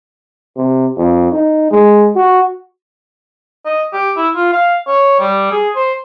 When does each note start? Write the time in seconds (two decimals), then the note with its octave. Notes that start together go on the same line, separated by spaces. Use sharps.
0.57 C3
0.98 F2
1.32 D#4
1.71 G#3
2.16 F#4
3.66 D#5
3.93 G4
4.17 E4
4.36 F4
4.53 F5
4.87 C#5
5.19 G3
5.52 G#4
5.76 C5